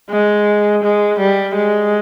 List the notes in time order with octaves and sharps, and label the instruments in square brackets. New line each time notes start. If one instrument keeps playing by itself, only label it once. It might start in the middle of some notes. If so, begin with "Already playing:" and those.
[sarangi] G#3
G#3
G3
G#3